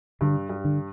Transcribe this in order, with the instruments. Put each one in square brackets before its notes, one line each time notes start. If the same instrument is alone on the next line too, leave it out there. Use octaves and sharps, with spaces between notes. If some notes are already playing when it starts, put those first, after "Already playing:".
[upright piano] G2 [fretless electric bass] D3
[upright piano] G2
[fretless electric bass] D3